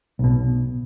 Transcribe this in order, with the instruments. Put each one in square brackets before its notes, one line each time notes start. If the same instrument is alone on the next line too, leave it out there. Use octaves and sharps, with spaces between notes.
[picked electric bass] B1 B2